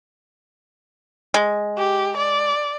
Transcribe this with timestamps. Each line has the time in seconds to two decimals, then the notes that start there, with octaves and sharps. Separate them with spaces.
1.34 G#3
1.78 G4
2.17 D5